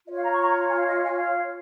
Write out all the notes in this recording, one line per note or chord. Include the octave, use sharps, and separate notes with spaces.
F4 C#5 D#5
F5
A#5
C#6
A#5
A#5
G#5
F5
D#5
F5
G#5
F5